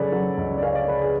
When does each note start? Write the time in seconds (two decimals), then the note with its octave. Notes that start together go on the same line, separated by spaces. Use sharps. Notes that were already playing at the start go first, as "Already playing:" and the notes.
Already playing: C#3 F#3 A4 B4 C#5 D5
0.12 F#3
0.37 C#2
0.58 D5
0.63 C#4 F5
0.75 D5
0.88 C#3 B4
1.01 G#4